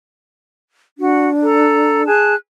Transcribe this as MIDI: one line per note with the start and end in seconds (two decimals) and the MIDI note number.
0.98 2.07 62
0.98 1.29 66
1.43 2.03 69
1.43 2.03 82
2.07 2.34 68
2.07 2.34 81
2.07 2.34 90